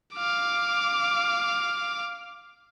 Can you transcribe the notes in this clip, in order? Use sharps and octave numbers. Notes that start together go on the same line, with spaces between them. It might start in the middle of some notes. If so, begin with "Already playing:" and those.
F5 D6